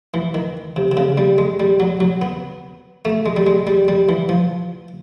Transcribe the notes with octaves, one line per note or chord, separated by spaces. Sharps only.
E3
D#3
C3
C3
C#3
G3
G#3
G3
F#3
F#3
B3
A3
G#3
G3
G#3
G3
G3
E3
F3